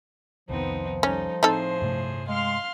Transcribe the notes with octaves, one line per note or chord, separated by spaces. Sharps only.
C2 F2 D#3 F3 B3 C4 D#4
G3 C#4 D#4 A4
A2 C4 D#4 G#4 A4 C5
G2 C3 A3
G#3 F5 C6 F6